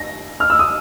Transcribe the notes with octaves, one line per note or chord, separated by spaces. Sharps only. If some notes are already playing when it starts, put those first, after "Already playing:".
Already playing: A#6
F6
E6
D#6